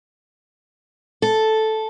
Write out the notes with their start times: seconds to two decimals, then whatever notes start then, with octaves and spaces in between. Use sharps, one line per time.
1.22 A4